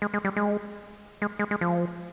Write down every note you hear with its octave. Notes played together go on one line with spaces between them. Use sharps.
G#3
G#3
G3
G#3
G#3
G#3
G#3
F3